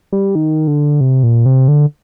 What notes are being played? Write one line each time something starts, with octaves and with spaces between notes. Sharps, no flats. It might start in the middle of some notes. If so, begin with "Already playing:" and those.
G3
D#3
D3
C3
A#2
C3
D3